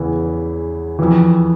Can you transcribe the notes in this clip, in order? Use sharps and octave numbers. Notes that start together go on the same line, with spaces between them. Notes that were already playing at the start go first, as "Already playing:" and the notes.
Already playing: E2 C#3 E3
F2 E3